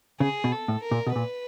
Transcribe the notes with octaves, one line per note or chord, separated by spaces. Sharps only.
C#3 G#4
B2
A4
A2
A#4
A#2
B2
A#2 B4